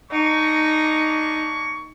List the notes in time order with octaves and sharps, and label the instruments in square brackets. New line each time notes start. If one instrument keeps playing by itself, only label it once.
[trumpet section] A#3 D4 C#6 [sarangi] D#4